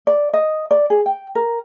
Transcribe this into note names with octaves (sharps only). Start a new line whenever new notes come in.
D5
D#5
D5
G#4
G5
A#4